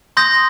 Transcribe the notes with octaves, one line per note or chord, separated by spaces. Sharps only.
C6 D#6 G6 A#6